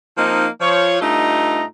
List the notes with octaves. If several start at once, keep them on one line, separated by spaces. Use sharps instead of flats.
F3 A#3 C4 D#4
F3 C#5
G2 A3 D#4 F4 D#5 A#5